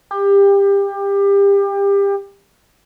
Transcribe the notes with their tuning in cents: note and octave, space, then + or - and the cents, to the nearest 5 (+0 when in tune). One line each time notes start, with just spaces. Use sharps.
G4 +25